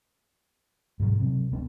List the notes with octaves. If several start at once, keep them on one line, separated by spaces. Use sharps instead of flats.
G#2 B2 D#3 F#3
C3 F#3
D1 B3 D4